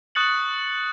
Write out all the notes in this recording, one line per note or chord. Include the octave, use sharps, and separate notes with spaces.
C#6 D#6 F#6 A6 C#7 F#7